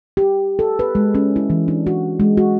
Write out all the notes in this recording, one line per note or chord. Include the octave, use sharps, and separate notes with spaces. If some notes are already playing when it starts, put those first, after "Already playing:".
G4
A4
B4
G#3
C#4
E4
E3
D4
F#4
G#3
F#4